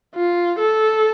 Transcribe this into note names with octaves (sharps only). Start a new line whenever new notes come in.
F4
A4